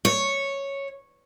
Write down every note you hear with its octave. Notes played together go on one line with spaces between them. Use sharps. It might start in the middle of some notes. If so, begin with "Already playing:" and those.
C#5